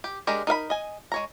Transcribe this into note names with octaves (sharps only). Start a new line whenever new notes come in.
G4
G#3 D4 G4 A#4
D#4 A#4 F5 B5
D#5 G#5
G#3 C#5 A#5